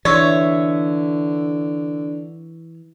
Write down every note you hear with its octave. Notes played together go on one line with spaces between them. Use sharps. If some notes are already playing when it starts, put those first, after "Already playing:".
D3 E3 C#5 D5 E5 C6 C#6